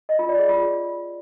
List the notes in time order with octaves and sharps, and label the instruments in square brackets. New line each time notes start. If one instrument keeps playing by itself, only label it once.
[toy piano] D#5
F4
D5
G#4
F4